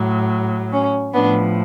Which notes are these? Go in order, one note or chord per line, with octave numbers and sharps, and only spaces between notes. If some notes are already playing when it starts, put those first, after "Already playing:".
Already playing: A2 F#3
C#4
A2 F3 B3 D4